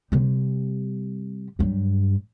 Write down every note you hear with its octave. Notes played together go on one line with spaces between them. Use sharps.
C3 G3
G2 F#3